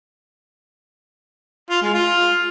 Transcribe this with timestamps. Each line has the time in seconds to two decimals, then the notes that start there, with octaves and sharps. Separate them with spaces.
1.70 F4
1.82 G#3
1.94 F4